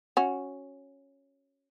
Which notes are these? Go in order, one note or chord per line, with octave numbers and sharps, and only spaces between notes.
C#4 F#4